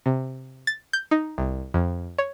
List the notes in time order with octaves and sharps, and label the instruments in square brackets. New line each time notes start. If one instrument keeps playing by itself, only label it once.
[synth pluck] C3
A6
G6
D#4
C2
F2
C#5